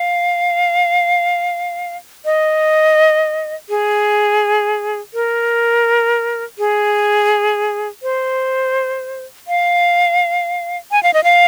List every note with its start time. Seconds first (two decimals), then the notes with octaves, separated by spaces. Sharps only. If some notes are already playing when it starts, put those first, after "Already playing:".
Already playing: F5
2.25 D#5
3.69 G#4
5.14 A#4
6.58 G#4
8.03 C5
9.48 F5
10.91 G#5
11.03 F5
11.14 D#5
11.24 F5